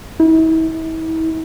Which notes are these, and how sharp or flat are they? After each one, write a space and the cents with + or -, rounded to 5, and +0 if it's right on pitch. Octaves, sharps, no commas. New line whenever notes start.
E4 -40